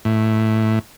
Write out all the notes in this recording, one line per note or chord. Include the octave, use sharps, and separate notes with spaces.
A2